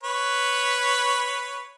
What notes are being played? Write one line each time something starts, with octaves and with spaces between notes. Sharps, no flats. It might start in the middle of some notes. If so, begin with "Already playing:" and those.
B4 C#5